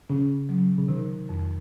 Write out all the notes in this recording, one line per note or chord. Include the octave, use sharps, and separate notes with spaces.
C#3 C#4
F#3
C#3
C3 D#3
F2